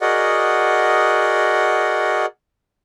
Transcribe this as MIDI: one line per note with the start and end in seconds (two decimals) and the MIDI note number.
0.01 2.26 66
0.01 2.26 68
0.01 2.26 70
0.01 2.26 74
0.01 2.26 75
0.01 2.26 78